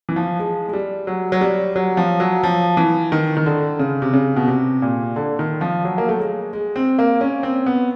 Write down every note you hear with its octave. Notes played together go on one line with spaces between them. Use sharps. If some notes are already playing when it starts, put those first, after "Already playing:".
E3
F3
G#3
G#3
G3
F#3
F#3
G3
F#3
F3
F#3
F3
E3
D#3
D#3
D3
C#3
C3
C#3
B2
C3
A#2
D3
D#3
F3
F#3
A#3
A3
G#3
G#3
C4
A#3
C#4
C4
B3